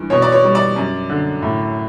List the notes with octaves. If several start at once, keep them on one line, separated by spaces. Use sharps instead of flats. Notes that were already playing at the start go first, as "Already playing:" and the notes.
Already playing: G2 E3
B2 C#5
D5
C#5
G3
D5
F#2
D3
A2